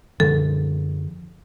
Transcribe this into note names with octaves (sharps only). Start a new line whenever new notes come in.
F#2 D3 F3 A4